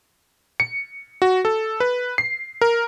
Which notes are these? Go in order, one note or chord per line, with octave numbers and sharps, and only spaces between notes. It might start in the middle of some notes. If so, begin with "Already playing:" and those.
C#7
F#4
A4
B4
C7
A#4